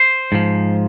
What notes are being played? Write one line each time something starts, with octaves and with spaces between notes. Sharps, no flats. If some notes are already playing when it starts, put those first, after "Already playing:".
Already playing: C5
G#2 F3